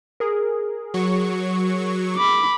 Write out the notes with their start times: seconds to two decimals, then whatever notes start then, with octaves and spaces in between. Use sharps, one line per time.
0.20 G#4 A#4
0.94 F#3 C#6
2.17 B5 D6